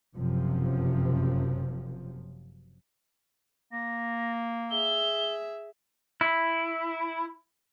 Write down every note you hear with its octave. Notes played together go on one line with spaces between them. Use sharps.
F#1 F#2 C3 F3
A#3 A#6
G#4 E5 G7
E4